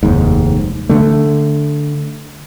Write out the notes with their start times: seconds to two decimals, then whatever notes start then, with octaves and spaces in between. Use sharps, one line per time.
0.03 F1 D#2 G#2
0.89 D3 A3